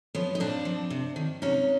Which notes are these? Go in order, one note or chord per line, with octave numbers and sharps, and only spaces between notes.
F3 B3 C#4
D#4
A#2 C4 D4
F3
C3
D#3
C3 C#4 D#4